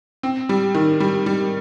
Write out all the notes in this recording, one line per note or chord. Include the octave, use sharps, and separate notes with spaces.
C4
G3
D#3
G3
G3